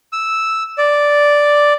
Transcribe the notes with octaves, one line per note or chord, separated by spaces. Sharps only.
E6
D5